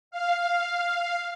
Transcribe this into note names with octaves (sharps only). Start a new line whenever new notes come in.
F5